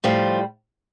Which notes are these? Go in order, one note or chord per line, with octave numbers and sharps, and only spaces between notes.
A2 F3 G3 F4